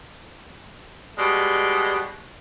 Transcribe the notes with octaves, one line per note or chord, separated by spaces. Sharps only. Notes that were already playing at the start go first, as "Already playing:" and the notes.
B2 G3 G#3